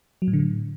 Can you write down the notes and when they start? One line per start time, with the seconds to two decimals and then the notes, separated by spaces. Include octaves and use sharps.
0.22 F#3
0.28 A2
0.33 D3
0.39 A2